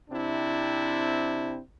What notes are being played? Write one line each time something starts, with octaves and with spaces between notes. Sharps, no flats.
C3 C4 D4 E4